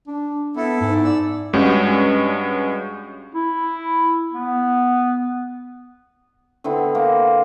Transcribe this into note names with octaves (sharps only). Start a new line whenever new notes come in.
D4
B3 E4 A4
G#2
D5 E6
G2 G#3 C#4 F#4
E4
B3
D3 B3 C4 E4
A#3